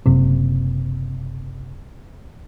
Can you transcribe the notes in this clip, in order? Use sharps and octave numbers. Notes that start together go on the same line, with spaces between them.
F#1 C3